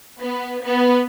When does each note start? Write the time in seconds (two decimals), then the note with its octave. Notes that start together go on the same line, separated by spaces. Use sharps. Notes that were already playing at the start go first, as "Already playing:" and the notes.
0.19 B3
0.62 B3